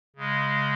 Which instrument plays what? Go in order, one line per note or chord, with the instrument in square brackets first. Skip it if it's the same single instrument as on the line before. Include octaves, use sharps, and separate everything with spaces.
[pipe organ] C#3 G#3